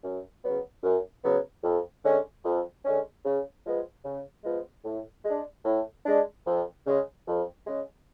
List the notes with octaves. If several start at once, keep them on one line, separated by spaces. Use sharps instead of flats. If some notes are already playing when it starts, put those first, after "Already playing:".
F#2
C#3 F#3 B3
F#2
C#3 F#3 B3
F2
D3 G#3 C#4
F2
D3 G#3 C#4
C#3
F3 G#3 B3
C#3
F3 G#3 B3
A2
G#3 D4
A2
G#3 D4
F2
C#3 G#3
F2
C#3 G#3